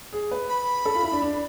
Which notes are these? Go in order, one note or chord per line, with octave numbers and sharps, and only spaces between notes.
G#4
B4
B5
A4
F4
E4
D4
D4